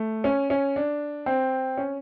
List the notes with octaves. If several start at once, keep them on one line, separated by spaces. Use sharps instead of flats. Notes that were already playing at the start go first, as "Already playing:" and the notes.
Already playing: A3
C#4
C#4
D4
C4
C#4